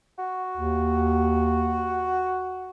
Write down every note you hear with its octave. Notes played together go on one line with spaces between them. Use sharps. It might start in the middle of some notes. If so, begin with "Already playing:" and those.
F#4
D#2